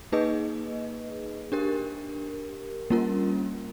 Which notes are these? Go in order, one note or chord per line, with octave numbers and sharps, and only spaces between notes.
A#3 D#4 G#4 B4 D#5
D4 G4 A#4
G3 A#3 C#4 F4 A#4